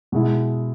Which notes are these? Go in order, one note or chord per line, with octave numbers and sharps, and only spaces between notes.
B2 G#3 E4